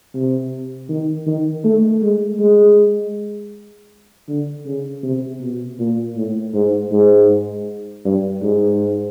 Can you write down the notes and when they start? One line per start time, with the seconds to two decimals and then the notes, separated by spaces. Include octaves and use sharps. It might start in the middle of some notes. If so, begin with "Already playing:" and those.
0.14 C3
0.89 D#3
1.27 D#3
1.64 A3
2.02 G#3
2.40 G#3
4.28 D3
4.66 C#3
5.03 C3
5.41 B2
5.79 A#2
6.16 A2
6.54 G#2
6.92 G#2
8.05 G2
8.42 G#2